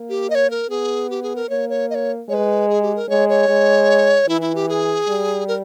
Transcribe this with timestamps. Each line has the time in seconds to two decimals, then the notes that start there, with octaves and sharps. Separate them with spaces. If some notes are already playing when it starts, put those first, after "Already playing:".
Already playing: A#3
0.10 G4
0.30 D#5
0.35 C#5
0.50 A#4
0.70 B3 G#4
1.10 G4
1.23 G#4
1.36 A#4
1.50 A#3 C#5
1.69 C#5
1.90 D#5
1.95 C#5
2.29 G#3 C#5
2.34 B4
2.69 G#4
2.82 G4
2.96 A#4
3.09 G#3 C#5
3.29 C#5
3.49 G#3
4.28 E3 E4
4.41 E4
4.55 G4
4.69 G#4
5.08 G3
5.48 A#4